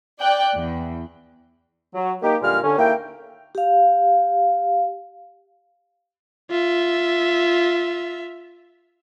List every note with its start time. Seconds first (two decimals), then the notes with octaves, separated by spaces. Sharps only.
0.19 D5 G5 F#6
0.55 E2
1.95 F#3
2.22 A#3 D#4 G4
2.42 A#2 D3 G3 G#3 F5 F6
2.64 D3 C#4
2.78 D#2 A#3 E4 G5
3.55 G4 F5
6.51 F4 E5